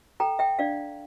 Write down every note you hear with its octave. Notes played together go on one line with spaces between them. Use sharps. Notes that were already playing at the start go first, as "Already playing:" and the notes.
A4 G5 A#5
E5 G5
D4 D5 F5